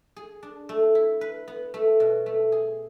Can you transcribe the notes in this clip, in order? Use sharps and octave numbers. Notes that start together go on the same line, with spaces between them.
G#4
D4
A3
E4
B4
B3
A3
B2
A3
G#4